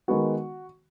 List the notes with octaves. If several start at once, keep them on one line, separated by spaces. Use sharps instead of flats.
D#3 G#3 B3 F#4